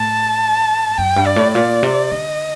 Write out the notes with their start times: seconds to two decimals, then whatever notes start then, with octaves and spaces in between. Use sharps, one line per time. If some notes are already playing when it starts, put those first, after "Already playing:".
Already playing: A2 A5
0.98 F#2 G5
1.16 G2
1.26 D5
1.36 A2
1.54 A#2 D5
1.83 C3
2.11 D3 D#5